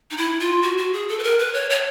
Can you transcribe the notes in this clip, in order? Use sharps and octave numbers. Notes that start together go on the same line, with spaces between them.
D#4
E4
F4
F#4
F#4
G#4
A4
B4
A#4
B4
C#5
C#5